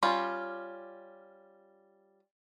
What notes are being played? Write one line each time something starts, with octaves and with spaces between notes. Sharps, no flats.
G3 C#4 F4